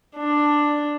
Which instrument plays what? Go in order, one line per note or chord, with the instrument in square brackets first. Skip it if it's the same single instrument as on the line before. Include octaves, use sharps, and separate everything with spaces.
[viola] D4